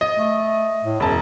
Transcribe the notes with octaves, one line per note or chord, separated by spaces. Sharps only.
D#5
A3
A2
E1 F#2 A5